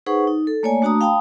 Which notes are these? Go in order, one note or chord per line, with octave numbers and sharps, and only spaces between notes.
D#4 G#4 B4 C5 F#5 C#6
D#4
A4
A3 A#3 C#5 D5 G#5
A3 D4 F#4 A5 A#5 D#6
F5 G5 A5 B5 D#6